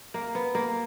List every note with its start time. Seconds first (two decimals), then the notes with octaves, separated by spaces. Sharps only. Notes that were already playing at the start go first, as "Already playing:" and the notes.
0.14 A#3
0.35 B3
0.55 A#3